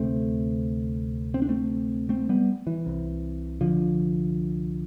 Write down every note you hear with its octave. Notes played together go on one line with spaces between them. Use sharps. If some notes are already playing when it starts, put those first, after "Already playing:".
Already playing: D2 C3 A3 C4
C4
D4
A3 C4
A3 C4
G3 B3
E3
C2 C3
D3 F3